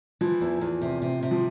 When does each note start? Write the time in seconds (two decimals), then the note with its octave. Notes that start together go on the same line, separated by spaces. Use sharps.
0.21 E3 F3
0.41 E2
0.61 E2
0.82 C3
1.02 C3
1.22 C3
1.31 F3